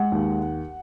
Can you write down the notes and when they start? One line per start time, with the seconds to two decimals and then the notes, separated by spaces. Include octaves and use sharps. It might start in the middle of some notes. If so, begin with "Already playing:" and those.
Already playing: G#3 F#5
0.12 D#2